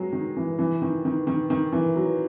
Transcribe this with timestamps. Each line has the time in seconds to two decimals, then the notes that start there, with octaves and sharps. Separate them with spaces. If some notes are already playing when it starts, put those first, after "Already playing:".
Already playing: F#3 G#3
0.12 D#3
0.37 E3
0.59 E3
0.82 D#3
1.05 D#3
1.27 D#3
1.50 D#3
1.72 E3
1.96 F#3